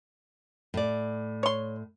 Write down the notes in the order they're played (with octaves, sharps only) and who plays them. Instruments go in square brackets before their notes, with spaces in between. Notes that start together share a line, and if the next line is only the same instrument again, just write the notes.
[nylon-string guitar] A2 D5
[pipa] C#5 C6